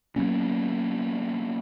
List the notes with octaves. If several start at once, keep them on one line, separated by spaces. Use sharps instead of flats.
F#3 A#3 B3 C#4